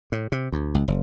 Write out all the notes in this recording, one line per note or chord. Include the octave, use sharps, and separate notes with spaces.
A2
C3
D2
C#2
F#1